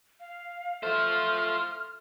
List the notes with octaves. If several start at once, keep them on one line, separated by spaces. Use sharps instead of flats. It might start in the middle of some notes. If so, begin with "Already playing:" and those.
F5
A3 F4 C5 F6